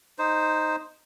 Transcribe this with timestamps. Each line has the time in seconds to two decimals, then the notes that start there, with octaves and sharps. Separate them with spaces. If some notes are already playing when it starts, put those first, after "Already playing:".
0.19 D#4 C5